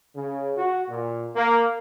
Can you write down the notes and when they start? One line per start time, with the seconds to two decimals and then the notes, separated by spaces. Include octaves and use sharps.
0.15 C#3
0.58 F#4
0.89 A#2
1.36 A#3